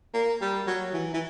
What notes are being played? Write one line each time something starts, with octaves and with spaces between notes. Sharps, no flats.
A#3
G3
F#3
E3
E3